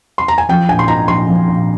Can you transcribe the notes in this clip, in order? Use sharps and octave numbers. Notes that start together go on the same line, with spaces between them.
C6
A#5
G#5
F3 G5
A#1 G#5
C6
G#2 A#5
A#1 C6
F3
A#1